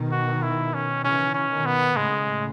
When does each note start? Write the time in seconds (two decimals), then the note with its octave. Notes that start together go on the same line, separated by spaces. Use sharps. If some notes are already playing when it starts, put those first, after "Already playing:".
Already playing: B2 D#3
0.12 F#4
0.43 E4
0.74 C#4
1.04 C#3 E3 C#4
1.34 C#4
1.50 B2 D#3
1.66 B3
1.96 A2 C#3 G#3